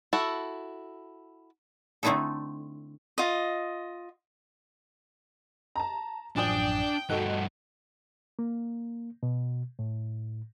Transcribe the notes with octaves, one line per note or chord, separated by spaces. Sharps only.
E4 F#4 A4
D3 A3 C4 D#4 E4 A4
F4 D#5
A5 A#5
A1 F#2 F3 D4 D5 G5 G#5 D#6
G2 A3 D#4 F#4 A4 F#5
A#3
B2
A2